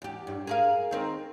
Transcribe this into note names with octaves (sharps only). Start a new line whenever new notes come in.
E2 G4
G2
G#4 A#4 F5
D#3 C4 A#4